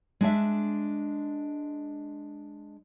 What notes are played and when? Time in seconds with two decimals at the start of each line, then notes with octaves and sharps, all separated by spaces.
0.21 G#3 D4 E5